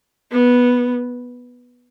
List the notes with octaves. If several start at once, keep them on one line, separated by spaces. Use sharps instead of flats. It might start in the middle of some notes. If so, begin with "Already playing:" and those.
B3